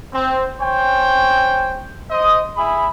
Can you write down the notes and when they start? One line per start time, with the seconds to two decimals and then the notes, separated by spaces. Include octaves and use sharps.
0.13 C4
0.61 C#4 C5 C#5 G5
2.10 C5 D#5 D#6
2.57 E4 G#4 B5